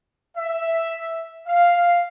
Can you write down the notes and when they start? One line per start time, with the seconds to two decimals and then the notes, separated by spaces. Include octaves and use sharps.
0.37 E5
1.46 F5